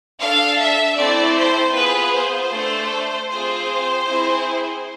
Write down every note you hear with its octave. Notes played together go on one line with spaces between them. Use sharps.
D4 A4 F5
E5
A3 C4 E4 A4 D5
C5
B3 F4 G#4 B4
C5
A3 D4 A4
C4 F4 G#4 C5
C4 E4 G#4